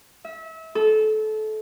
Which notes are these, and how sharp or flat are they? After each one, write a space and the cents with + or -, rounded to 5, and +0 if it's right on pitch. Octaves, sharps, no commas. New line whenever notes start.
E5 -30
A4 -25